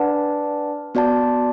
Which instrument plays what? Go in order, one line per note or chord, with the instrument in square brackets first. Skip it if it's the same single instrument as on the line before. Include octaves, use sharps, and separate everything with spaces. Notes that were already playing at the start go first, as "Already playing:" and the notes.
Already playing: [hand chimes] D4 B4 D5 F#5 A5
B3 F#4 D5 A5